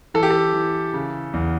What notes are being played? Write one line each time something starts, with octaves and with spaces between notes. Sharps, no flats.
E3 A4
G4
A4
E3
C#3
E2